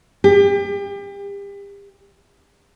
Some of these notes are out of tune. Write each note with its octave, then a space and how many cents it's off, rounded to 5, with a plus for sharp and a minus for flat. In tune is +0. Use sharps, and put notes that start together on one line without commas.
G4 +35